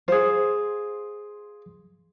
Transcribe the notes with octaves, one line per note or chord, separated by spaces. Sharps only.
F4 G#4 C5